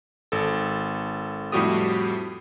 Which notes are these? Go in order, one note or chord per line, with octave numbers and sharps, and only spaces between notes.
G#1 A4
F2 A2 G3 F#4 G4 D#6